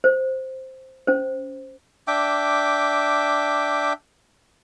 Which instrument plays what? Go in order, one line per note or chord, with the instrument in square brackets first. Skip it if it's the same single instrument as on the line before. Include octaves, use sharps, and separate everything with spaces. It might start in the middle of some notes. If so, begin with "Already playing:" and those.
[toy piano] C5
C#4 C5
[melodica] D4 E5 G5 D6